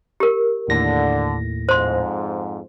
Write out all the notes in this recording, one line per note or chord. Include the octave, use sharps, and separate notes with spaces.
G4 A#4
D#2 A2 D3 A#6
F2 G#2 C5 C6